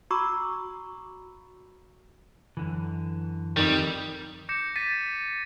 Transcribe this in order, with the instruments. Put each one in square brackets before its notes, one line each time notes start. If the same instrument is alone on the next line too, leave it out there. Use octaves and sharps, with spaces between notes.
[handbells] F#4 A#5 B5 C#6 D6 E6
[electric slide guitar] F#2 D3 E3
[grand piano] F2 D#3 [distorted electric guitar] G3
[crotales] D6 G6 A#6 C#7 E7
A6 B6 D#7